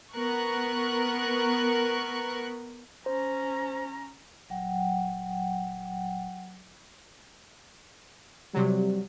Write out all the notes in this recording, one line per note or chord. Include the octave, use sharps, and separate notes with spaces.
B3 A#4 C#6 F#6
C#4 C5 A#5
D#1 F#3 F#5 G5
C3 F#3 G3